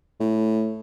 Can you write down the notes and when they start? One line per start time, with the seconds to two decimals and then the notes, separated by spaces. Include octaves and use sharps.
0.20 A2